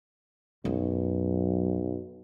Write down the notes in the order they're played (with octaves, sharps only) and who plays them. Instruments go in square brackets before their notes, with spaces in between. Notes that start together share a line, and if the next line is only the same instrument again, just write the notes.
[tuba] B1 [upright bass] F#2